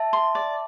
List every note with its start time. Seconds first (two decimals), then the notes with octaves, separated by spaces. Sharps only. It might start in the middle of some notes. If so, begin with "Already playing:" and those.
Already playing: E5 A5
0.13 C6
0.35 D5